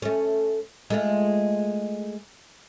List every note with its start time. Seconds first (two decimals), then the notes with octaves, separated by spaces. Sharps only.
0.02 A3 C#4
0.90 G#3 A3 F4